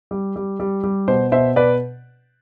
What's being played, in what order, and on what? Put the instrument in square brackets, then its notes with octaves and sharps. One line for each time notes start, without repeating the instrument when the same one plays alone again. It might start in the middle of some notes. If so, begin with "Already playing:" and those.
[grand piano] G3
G3
G3
G3
B2 C5
B2 C5 E5
B2 B4 D5